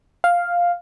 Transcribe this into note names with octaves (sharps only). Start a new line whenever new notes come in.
F5